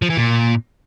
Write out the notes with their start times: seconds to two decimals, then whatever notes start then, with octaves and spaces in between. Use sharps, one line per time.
0.02 F3
0.10 E3
0.17 A#2